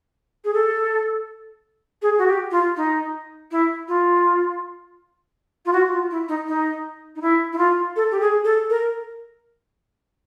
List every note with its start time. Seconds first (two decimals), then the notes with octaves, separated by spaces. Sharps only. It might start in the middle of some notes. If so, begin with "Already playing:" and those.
0.44 G#4
0.54 A4
2.02 G#4
2.18 F#4
2.27 G4
2.51 F4
2.76 D#4
3.51 E4
3.88 F4
5.65 F4
5.73 F#4
5.91 F4
6.10 E4
6.28 D#4
6.47 D#4
7.15 D#4
7.21 E4
7.53 E4
7.58 F4
7.96 A4
8.11 G4
8.20 G#4
8.44 A4
8.70 A#4